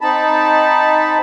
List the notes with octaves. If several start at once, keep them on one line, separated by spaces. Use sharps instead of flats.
C4 D#4 A5 B5